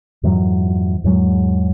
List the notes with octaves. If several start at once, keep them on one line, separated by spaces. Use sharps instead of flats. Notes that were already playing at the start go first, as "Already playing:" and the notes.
F2 G#2 E3 F#3
E2 G#2 F#3 G#3